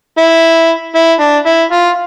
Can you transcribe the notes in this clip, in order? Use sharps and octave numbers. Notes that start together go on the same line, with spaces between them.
E4
E4
D4
E4
F4